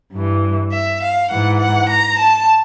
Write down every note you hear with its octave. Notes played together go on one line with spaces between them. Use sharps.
G2 E3
E5
F5
G#2 E3 F#5
F#5
A#5
A5